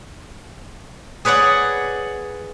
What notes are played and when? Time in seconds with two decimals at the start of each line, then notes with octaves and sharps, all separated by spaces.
1.25 G#4 B4 C#5 D5 F#5